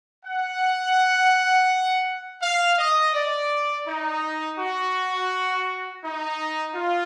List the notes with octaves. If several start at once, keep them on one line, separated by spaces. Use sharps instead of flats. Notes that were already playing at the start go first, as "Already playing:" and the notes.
F#5
F5
D#5
D5
D#4
F#4
D#4
F4